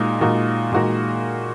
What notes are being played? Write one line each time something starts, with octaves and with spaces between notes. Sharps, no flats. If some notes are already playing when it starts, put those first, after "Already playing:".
Already playing: A#2 G#3 D#4 F#4 A#4
A#2 G#3 D#4 F#4 A#4
A#2 G#3 D#4 F#4 A#4